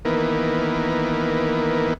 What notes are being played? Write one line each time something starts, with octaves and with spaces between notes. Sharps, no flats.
D#3 E3 A#3 B3